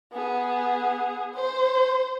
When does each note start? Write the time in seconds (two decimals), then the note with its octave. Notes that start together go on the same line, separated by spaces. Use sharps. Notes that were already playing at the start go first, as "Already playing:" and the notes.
0.12 B3 G#4
1.34 C5